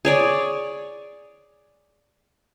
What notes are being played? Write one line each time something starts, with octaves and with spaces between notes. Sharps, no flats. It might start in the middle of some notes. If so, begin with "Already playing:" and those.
G#4 C#5 D5